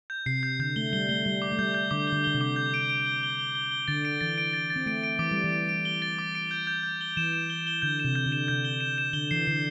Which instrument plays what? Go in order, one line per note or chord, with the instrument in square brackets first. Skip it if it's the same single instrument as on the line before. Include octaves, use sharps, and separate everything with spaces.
[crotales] G6
[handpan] C3 [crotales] C7
[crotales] G6
[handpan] D3 [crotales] G6
[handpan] A3 [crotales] G7
[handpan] G3 [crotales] G7
[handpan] A3 [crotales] G7
[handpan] G3 [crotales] G7
[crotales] D6
[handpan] A3
[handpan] G3 [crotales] G6
[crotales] G6
[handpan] D3 [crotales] D6
[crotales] G7
[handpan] D3
[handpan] D3 [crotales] G7
[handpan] C3
[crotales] D6
G6
D7
D7
G7
G7
G7
G7
G7
[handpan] D3 [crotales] A6
[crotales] D7
[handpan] E3 [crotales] A6
[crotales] D7
A6
A6
[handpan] C4
[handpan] A3 [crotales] D7
[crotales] D7
[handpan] E3 [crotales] D6
[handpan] G3 [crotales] D7
[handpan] E3
[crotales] D7
D7
G7
A6
D6
D7
G6
G6
G6
G7
[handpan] E3 [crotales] E7
[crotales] E7
G7
G7
[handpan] D3 [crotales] G6
[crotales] E7
[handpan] C3
[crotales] G6
[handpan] D3
[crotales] E7
[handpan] C3 [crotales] G6
[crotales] G7
E7
E7
[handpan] D3 [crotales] G7
[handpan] E3 [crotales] C7
[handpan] D3 [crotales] C7